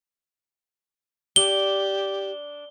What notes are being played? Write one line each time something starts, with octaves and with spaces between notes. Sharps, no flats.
D4 G4 G7